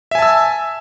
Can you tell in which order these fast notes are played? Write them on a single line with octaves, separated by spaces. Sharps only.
E5 G#5 A5 E6